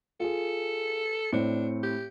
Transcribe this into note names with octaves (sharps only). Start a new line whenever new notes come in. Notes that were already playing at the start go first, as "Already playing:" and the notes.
F4 G#4 A4
A2 C4 D4 C#7
G4